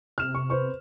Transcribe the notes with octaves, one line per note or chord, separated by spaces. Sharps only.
C3 F6 E7
C#6
B4 C5 C#6